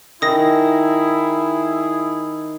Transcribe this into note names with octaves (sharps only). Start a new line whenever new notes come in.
D#3 E4 G#4 D#6 A#6